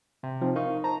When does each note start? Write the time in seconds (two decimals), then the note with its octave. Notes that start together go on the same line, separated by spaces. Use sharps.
0.23 C3
0.41 F3 C4 D#4
0.56 D#4 A#4 F5 C#6
0.84 C5 A5 A#5